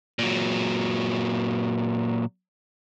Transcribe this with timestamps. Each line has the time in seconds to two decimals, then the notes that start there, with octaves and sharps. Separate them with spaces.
0.19 A#2 F#3